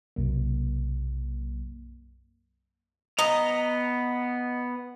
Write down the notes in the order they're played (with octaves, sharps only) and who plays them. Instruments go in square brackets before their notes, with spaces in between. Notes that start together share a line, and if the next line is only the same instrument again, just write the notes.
[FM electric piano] B1 F#2 C3 F#3 A#3
[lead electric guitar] B3 A#5 [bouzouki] D#5